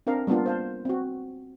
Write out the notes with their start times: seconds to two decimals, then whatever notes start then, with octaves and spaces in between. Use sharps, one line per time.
0.07 C4 D4 A#4 F5
0.27 G3 A#3 B3 D4 F4
0.46 C5 F5 A5
0.85 C4 F#4